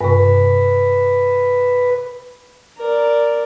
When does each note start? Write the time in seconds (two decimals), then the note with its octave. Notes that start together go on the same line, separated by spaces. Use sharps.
0.01 G2 C3 B4
2.77 A#4 D5